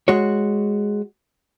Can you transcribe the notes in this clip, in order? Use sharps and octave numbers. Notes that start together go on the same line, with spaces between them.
G#3 F#4 C#5